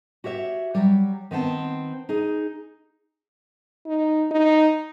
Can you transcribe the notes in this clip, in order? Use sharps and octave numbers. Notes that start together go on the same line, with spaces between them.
F#4 G4 C#5 E5
F#3 G3
D#3 B3 C4 A5
D#4 G#4
D#4
D#4